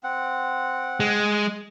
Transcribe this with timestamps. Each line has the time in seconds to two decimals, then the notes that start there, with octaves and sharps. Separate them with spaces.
0.04 C4 F#5
1.00 G#3